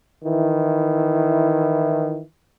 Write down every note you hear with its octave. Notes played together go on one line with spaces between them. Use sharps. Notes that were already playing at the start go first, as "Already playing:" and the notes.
D#3 E3 E4